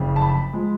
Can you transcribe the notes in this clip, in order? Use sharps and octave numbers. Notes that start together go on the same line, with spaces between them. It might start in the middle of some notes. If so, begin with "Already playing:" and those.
Already playing: F#1 F2 C#3
A5
B5
F3 G#3